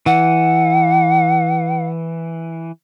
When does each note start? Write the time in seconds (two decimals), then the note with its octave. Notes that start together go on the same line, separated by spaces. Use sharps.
0.06 E3 F#5